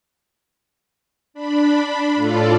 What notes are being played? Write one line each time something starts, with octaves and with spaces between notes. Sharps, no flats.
D4 B5
A2 F4 A4 D5